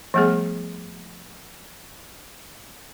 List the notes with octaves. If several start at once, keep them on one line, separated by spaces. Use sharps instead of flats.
F3 G3 A3 B3 G#4